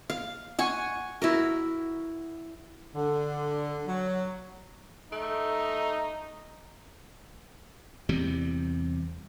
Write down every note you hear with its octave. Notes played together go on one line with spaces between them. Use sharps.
F5
F#5 G#5 C#6
E4 F#4 A#4
D3
F#3
A3 D#4
E2 C3 G3